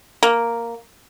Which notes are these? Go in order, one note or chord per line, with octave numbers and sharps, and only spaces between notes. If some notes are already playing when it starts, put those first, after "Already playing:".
A#3